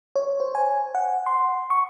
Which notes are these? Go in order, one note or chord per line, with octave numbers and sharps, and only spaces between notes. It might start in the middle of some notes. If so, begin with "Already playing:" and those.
C#5
C5
G#5
F#5
C6
C#6